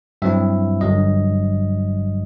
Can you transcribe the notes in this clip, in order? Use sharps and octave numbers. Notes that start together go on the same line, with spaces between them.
G2 F#3 C4 E4 E5
G1 G2 F#3 D#5